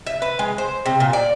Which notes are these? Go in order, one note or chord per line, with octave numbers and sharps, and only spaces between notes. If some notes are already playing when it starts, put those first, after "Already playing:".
E5
B4
G#3
C5
C3
A#2
D5